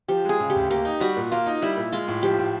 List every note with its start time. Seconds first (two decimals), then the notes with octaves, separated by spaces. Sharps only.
0.08 F3 G4
0.25 G#3 G#4
0.40 C#3
0.50 G4
0.55 D2
0.70 A#3 G4
0.85 D#4
1.00 G3 F#4
1.17 A#2
1.32 A#3 F4
1.46 D#4
1.62 G3 E4
1.77 A#2
1.93 G#3 F4
2.08 A2
2.23 F3 G4
2.39 A2